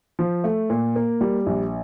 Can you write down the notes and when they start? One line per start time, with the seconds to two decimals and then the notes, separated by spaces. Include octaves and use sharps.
0.19 F3
0.44 A3
0.70 A#2
0.96 A#3
1.21 G3
1.46 A#1